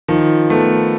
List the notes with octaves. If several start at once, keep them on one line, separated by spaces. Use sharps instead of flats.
D#3 F3
A3 B3